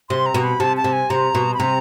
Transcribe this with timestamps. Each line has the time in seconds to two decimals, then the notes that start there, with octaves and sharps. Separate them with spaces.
0.09 C3 C6
0.26 A#5
0.34 B2
0.44 B5
0.60 C3 A5
0.77 A5
0.84 C3
0.93 G#5
1.10 C3 A#5
1.35 B2
1.54 B5
1.59 C3 A#5